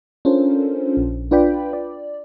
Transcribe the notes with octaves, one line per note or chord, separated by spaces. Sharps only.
C#4 D4 F4 A4 A#4 C5
A#1
D4 F4 B4 D5 G5 B5
D5